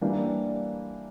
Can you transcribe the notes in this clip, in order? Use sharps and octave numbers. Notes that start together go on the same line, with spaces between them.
E3 G3 A#3 D4 G4